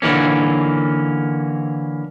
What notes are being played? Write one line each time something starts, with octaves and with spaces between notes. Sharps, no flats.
D3 E3 A#3 C#4